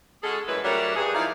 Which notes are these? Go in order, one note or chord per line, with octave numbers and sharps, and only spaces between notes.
G#3 C#4 F#4 G#4 A4
F#2 E3 G#3 A3 E4 B4
F#3 G3 A3 D4 A#4 C#5
G2 G#4
F3 D#4 E4 D5 F5